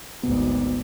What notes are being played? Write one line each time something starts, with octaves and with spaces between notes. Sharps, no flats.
G#1 D2 B3